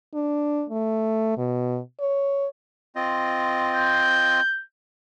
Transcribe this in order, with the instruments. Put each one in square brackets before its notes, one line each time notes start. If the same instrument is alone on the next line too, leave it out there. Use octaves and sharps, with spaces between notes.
[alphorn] D4
A3
B2
C#5
[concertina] C4 F4 D#5
[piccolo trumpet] G6